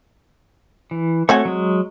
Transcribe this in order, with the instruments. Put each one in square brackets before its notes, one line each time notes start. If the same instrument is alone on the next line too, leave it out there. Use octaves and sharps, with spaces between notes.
[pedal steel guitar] E3
[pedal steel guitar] A3 C#5 [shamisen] C4 F#4 G#5
[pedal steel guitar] F#3 G#3